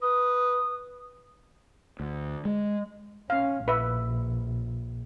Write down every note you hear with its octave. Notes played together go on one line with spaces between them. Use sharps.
B4 D#6
D2
G#3
C#4 F5
A#1 B4 E5